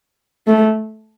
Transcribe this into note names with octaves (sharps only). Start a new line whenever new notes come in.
A3